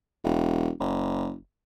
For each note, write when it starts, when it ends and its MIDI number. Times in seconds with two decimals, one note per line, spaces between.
0.24 0.70 28
0.80 1.36 30